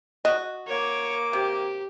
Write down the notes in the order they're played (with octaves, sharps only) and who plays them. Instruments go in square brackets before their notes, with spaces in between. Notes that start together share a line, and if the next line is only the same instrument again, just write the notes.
[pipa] F#4 [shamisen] D#5
[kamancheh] A#3 D6 [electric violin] C#5
[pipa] C3 [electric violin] G4